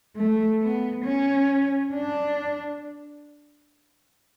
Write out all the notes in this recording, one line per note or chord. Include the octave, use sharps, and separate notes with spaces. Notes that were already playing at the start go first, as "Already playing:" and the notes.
A3
B3
C#4
D4